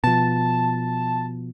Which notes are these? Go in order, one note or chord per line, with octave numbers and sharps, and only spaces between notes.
B2 F3 A5